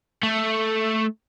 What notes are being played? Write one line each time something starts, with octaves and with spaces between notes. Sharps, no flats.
A3